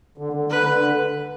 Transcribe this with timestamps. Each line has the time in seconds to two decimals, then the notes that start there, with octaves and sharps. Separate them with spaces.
0.18 D3
0.33 D3
0.50 D3 B4
0.66 D3